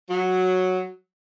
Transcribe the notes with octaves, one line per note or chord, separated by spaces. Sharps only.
F#3